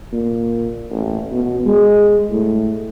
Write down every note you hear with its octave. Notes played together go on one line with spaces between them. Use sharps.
A#2
A1
B2
G#3
A2